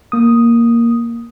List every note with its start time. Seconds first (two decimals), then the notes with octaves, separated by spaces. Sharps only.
0.12 A#3 D#6